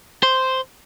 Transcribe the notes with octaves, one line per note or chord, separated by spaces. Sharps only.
C5